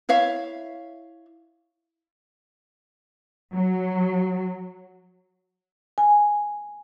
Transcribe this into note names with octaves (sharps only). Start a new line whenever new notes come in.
E4 C#5 E5 F5
F#3
G#5